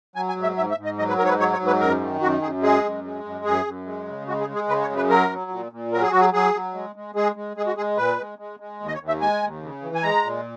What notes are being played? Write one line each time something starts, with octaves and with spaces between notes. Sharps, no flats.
F#3 G#5
G#5
G#2
E5
G#2 E5
E5
G#2
D#5
F#3 D#5
B4
G#2 A#4
C#5
B4
F#3 C#5
C#5
G#2
B4
F#2 A#4
D#3
F#2 F#4
F#2 G#4
G#3 G#4
F#2
G#3
F#2
F#2 G#4
F#2
G#3
C#3
G#3 F#4
G#4
G#3
G#4
C#3 B4
C#5
F#2
B4
F#3 A#4
F#3
A#2
A#2
F#3 A#4
G#4
F#3 F#4
G#4
F#3 G#4
F#3
G#3
G#3
G#3 G#4
G#3
G#3 G#4
F#4
G#3 G#4
A#2 B4
G#3
G#3
G#3
D#2
D#5
C#5
D#2
E5
G#3 G#5
D#2
C#3
E3
G#5
G#3 A#5
A#2